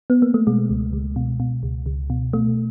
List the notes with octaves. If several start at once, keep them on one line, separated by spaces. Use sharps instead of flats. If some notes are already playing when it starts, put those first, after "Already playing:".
B3
A#3
A3
B2 G#3
C#2
C#2
B2
B2
C#2
C#2
B2
B2 A3